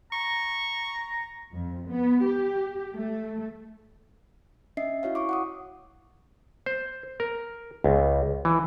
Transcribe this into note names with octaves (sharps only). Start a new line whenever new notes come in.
A#5 C#6
F2
B3
G4
A3
C#4 D4 D#5 E5 C7
E4 F#4 C#5 F5
C#5 C#6 D6
F#5 D6 D#6
C5
A#4
C#2
E3